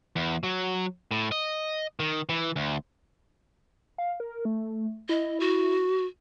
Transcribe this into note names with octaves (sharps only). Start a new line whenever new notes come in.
E2
F#3
A2
D#5
D#3
E3
D2
F5
A#4
A3
E4 D#5
F#4